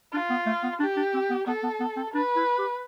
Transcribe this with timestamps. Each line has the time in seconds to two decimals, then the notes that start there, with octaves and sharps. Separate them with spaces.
0.13 D4 F4
0.30 B3
0.46 A3
0.63 B3
0.80 D4 G4
0.97 D4
1.14 C4
1.30 B3
1.47 B3 A4
1.63 B3
1.80 B3
1.97 C4
2.14 D4 B4
2.36 E4
2.59 G4